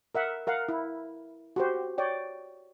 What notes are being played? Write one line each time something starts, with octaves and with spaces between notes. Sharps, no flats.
A#4 E5 F#5
A#4 F5 F#5
E4
F#4 G4 C5
C#5 D5 G5